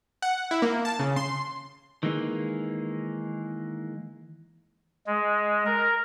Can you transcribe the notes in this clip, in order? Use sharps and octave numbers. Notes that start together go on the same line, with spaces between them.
F#5
E4
A#3
A5
C#3
C6
D#3 E3 G#3 A#3 D#4
G#3
A#4